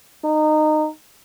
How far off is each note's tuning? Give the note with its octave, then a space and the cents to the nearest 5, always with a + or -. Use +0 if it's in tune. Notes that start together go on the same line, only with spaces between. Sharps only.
D#4 -20